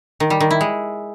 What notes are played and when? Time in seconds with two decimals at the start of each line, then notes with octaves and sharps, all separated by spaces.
0.20 D#3
0.30 G3
0.40 D#3
0.51 E4
0.61 G#3